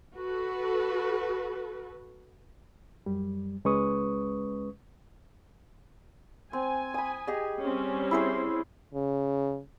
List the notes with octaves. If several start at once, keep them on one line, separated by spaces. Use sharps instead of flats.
F#4 A4 B4
F#2 G3
C#2 G#3 C#4 B4 C#6 D#6
C4 G#5
B5 D#6
G4 G#4 D#5
G3 C4 C#4
E4 G#4 C5
C#3